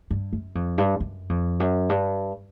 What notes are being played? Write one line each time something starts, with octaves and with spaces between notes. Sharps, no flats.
G2
F#2
F2
G2
F#2
F2
F#2
G2